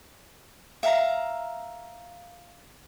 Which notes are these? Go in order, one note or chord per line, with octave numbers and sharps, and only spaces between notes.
E5 F5 A#5